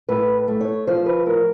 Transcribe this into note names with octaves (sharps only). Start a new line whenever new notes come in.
A2 B4
A3
C#5
F3 C5
B4
A2 A#4